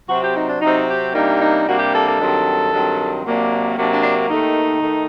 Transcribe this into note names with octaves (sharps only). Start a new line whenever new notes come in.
C3 F#3 C4 F#4
G4
D#4
D4
C3 F#3 C4 D#4
G4
C3 G3 A#3 D4 D#4
D#4
C3 G3 A#3 D4 F#4
G4
A4
A4
G2 D#3 F#3 C4
G2 D#3 F#3 C4
C3 F#3 A#3 D4
C3 F#3 A#3 D4
D4
D4
D#2 D#3 A3 D#4
D#3 A3